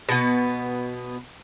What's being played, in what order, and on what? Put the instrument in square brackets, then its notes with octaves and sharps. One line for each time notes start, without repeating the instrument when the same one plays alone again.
[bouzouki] B2 B3